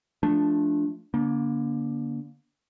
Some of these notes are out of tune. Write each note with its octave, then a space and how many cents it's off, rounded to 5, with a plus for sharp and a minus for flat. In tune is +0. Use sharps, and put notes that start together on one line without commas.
F3 +0 A3 -10 D4 +0
D3 -25 A#3 +30